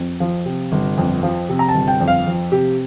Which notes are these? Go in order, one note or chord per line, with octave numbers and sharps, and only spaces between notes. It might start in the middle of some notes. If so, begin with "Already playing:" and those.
Already playing: F2
F3
C3
G1
F2
F3
C3
A#5
A5
G1
G5
F2
F5
F3
C3 G4